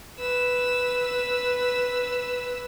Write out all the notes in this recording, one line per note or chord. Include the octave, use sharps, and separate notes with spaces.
B4 E6